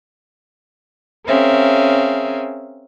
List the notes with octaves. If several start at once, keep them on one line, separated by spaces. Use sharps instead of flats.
C4 C#4 G#4 A#4 E5 F5